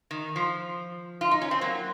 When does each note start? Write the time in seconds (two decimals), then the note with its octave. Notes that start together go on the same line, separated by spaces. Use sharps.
0.11 D#3
0.36 F3
1.21 F4
1.31 D#4
1.42 C#4
1.51 C4
1.61 F#3 A#3